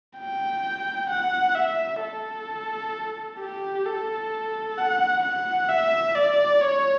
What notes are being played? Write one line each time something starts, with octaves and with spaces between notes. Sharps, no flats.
G5
F#5
E5
A4
G4
A4
F#5
F#5
E5
D5
C#5